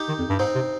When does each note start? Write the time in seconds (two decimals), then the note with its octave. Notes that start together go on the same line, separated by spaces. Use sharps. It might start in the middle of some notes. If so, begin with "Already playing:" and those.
Already playing: D#4 G4
0.08 D#3
0.19 F2
0.29 G2
0.39 G#2 C4 D#4
0.55 C3